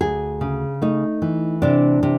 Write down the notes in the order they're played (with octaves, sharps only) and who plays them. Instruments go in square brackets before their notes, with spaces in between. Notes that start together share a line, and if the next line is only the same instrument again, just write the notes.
[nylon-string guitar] D2 G#4
C#3
A3 D#4
E3
C3 D4
C3